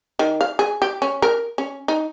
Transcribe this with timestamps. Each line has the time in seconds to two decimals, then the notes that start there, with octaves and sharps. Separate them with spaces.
0.19 D#3
0.41 F5
0.59 G#4
0.82 G4
1.02 C#4
1.22 A#4
1.58 C#4
1.88 D#4